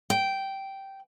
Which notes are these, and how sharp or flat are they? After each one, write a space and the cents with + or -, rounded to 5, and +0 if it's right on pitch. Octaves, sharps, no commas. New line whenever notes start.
G5 -10